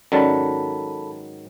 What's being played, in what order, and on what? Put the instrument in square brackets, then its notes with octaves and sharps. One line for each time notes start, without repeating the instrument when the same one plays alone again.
[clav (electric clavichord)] G#2 D#3 F#3 [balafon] C#4 D5 [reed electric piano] A4 A5 B5